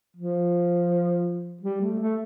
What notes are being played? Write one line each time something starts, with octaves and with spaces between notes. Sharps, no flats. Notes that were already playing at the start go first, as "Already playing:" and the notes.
F3
G3
A3
A3